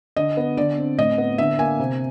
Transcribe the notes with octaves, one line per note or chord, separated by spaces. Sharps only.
D3 D#5
B3
D3 D5
C4
A2 D#5
B3
D3 E5
A#3 G#5
C3